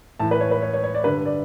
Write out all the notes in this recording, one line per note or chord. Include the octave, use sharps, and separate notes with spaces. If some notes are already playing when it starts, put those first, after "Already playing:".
A2 E3 A5
B4
C#5
B4
C#5
C#5
C#5
D5
G2 D3 B4
D5